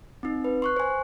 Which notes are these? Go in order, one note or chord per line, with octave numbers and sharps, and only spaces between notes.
C4 D#4
B4
C6 C#6 F#6
C5 G#5